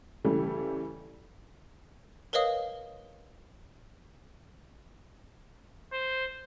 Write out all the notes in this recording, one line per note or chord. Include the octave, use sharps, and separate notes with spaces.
C#3 E3 G3 A3
A#4 B4 C#5 D#5 F5 D#6
C5